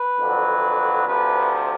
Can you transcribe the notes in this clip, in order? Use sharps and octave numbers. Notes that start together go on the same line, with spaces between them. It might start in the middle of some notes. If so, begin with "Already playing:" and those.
Already playing: B4
F2 D3 F#3
D2 C3 F3 B4